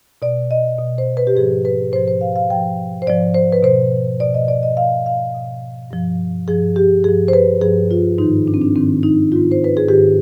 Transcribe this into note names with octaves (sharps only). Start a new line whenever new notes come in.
B2 D5
D#5
B2
C5
B4
G4
G#2 F3 G#4
B4
G#2 F3 C5
C5
F5
F5
G#2 F3 G5
C5
G#2 F3 D5
C5
B4
B2 C5
B2 D5
D#5
D5
D#5
B2 F5
F5
B2
G2 F3
G2 F3 G#4
G4
G2 F3 G#4
C5
B4
G2 F3 G#4
F4
G#2 D#3 D#4
D4
C4
D4
G#2 D#3 C4
D#4
G#2 D#3 F4
C5
B4
G#4
G#2 D#3 G4